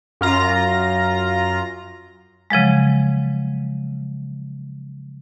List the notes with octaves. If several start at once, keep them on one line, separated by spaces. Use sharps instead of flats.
F#2 F4 A#5 A#6
C#3 F3 F#3 G#3